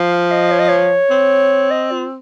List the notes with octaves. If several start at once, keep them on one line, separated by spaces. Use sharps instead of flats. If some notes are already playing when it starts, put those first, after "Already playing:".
Already playing: F3
F5
D#5
C#5
D#5
C#5
C4
D#5
F4